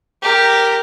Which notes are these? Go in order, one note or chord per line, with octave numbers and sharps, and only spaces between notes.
G4 A#4